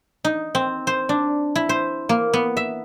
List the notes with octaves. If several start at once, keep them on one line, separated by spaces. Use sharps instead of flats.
D#4
C4
C5
D4
E4
C5
A#3
B3
E5